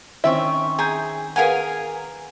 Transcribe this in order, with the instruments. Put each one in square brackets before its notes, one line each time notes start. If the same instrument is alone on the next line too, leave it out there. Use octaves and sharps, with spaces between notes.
[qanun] D#3 C4 C#4 [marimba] E4 [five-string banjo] E5
[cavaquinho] G#4 [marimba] G#5 A#5 G6
[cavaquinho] G#4 A#4 G#5 [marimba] B4 F5 F#5